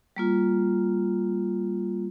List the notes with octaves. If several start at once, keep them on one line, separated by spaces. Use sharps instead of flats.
G3 A#3 F4